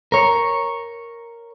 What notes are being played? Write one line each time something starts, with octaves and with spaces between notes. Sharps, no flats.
A#4 C#5